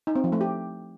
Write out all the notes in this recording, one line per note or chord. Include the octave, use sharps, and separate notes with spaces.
D#4
C4
F3
A3
G4